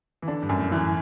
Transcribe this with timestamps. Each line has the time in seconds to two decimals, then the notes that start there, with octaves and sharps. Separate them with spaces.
0.22 E3
0.28 D3 D4
0.42 G2
0.49 F#2
0.58 A2
0.72 E3